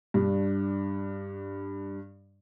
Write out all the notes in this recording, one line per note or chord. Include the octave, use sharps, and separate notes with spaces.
G2 D4